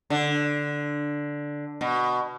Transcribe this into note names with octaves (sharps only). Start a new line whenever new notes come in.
D3
B2